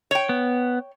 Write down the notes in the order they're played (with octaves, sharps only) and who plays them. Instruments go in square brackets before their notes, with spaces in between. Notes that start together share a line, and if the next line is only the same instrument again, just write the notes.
[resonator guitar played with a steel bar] C#5 G5
[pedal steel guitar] B3